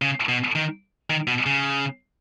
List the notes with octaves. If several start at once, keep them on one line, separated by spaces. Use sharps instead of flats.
C#3
B2
D#3
D#3
B2
C#3